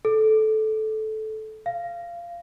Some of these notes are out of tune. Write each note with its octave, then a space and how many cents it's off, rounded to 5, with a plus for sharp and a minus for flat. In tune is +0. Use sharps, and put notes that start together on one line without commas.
A4 -15
F5 -20